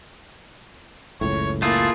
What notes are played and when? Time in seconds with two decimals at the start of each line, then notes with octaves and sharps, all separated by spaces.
1.21 F#1 C#2 A2 C#5
1.62 A3 A#3 E4 F4 G#4